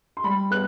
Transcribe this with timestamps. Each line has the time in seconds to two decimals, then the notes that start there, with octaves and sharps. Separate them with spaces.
0.17 C6
0.24 G3 B5
0.51 B3 F#6